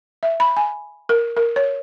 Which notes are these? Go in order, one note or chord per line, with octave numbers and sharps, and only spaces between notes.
E5
B5
G#5
A#4
A#4
C#5